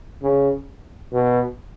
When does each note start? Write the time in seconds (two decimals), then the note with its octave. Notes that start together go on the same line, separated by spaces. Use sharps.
0.22 C#3
1.12 B2